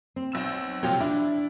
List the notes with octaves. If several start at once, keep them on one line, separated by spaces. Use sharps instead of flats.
C4
B1 E6 E7
C3 F3 F#3 F4 G5
D4 E4